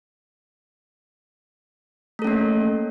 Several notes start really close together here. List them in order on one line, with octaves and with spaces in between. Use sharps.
A3 A4 C#4 A#3